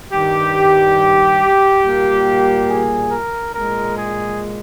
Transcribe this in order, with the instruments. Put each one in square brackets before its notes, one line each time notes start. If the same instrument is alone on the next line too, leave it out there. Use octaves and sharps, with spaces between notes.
[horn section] G2 D#3 G3 G4
A#2 G3 A#3
G#4
A#4
A#2 G#3 A#4
G#4